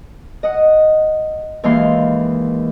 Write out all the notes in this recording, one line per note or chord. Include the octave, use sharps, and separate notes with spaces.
D#5 F#5
D#2 E3 G#3 A#3 F5 C6